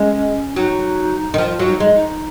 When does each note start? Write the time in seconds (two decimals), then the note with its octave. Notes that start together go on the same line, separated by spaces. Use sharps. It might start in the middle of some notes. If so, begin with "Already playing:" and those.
Already playing: G#3 C#4
0.56 F#3 D#4
1.34 D#3
1.38 F3 F4
1.59 F#3
1.67 D#4
1.80 G#3
1.94 D#4